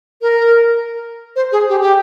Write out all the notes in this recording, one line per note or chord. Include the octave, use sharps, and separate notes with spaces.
A#4
C5
G#4
G4
G4